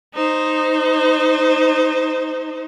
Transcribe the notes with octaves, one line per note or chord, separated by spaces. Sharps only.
D#4 C5